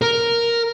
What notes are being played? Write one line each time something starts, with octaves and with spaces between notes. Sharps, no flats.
A#4